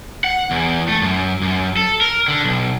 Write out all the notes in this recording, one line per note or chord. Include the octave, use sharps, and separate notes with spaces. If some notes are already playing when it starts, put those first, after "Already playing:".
F#5
E2
A3
F#2
F#2
A4
A#4
D3
B1